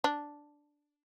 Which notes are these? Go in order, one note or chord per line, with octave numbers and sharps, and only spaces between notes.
D4